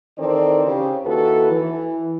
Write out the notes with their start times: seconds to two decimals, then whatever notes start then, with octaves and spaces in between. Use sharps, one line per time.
0.18 D#3 E3 C4 A4 A#4 D5
0.65 C#3 G4
1.04 D#2 E4 F#4 A4 B4
1.51 E3